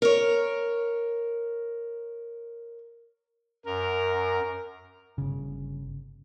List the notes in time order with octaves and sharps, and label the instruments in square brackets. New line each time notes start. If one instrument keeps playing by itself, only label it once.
[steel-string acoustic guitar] A#4 C#5
[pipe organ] F#2 [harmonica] A#4
[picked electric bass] G1 C#3